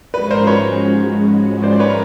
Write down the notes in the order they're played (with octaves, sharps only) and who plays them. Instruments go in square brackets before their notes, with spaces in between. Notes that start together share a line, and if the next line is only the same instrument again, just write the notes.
[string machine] G#2 F3 G#3 C#4 F#4 [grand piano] B4
[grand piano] A#4 C5
B4 C#5
C5 D5
D5
B4 C#5
A#4